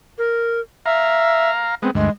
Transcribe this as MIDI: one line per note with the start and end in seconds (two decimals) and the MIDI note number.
0.18 0.60 70
0.86 1.50 76
0.86 1.75 77
0.86 1.75 82
1.82 1.91 56
1.82 1.91 59
1.82 1.90 60
1.95 2.10 38
1.95 2.10 43
1.95 2.10 56